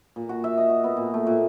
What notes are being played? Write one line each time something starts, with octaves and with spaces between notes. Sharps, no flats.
A#2
F#4
E5
D#5
F#4
B3
A#2
A3
A#2